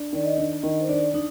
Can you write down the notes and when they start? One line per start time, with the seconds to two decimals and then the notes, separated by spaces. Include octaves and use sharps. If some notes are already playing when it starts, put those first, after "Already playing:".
Already playing: D4
0.13 D#3 D5
0.25 D#5
0.38 D4
0.63 D#3 D#5
0.81 C5
0.88 D4 D5
1.14 D4 D#4